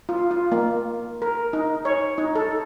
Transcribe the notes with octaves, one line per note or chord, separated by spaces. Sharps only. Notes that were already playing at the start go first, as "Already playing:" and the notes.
F4
F4
A#3
A#4
D#4
C#5
D#4
A4